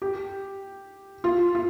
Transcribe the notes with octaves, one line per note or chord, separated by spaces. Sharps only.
G4
F4
F4